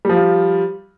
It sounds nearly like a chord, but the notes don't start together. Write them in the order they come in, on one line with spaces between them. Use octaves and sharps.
G3 F3 F4